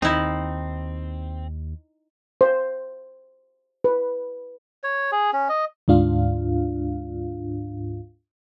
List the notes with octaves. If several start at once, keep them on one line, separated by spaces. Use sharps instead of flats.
D#2 C4 D#4 E4
C5
B4
C#5
G#4
C#4
D#5
D2 G#2 D4 F4 F5